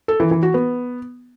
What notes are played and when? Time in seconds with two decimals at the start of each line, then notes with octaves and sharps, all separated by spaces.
0.08 A4
0.20 E3
0.31 E3
0.43 F#4
0.54 B3